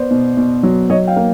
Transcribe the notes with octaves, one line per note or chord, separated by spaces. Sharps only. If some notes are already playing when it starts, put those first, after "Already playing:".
Already playing: B3 C5 D5
B2
B2
F#3
F#3 C#5 D#5
F5 G5
A#3